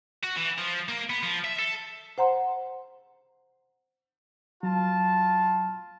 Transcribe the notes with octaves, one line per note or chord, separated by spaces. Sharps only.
F#4
E3
F3
A#3
B3
F3
E5
A4
C5 F#5 A#5 C6
F#3 F4 A5